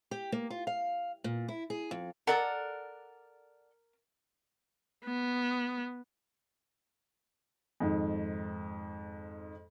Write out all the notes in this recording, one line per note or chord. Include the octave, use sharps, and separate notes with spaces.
G4
A#3
F4
F5
A#2
E4
G#4
F2
A4 A#4 D5 F#5
B3
F2 G#2 D#3